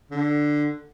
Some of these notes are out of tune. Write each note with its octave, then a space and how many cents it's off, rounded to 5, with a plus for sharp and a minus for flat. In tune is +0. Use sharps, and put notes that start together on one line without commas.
D3 +10